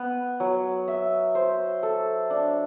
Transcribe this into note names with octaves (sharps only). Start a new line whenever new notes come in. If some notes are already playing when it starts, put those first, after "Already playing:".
Already playing: B3
F#3
E5
C5
A4
D4